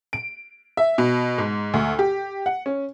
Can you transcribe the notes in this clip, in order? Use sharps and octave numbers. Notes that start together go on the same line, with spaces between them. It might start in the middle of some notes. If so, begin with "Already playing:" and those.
D7
E5
B2
G#2
D2
G4
F#5
C#4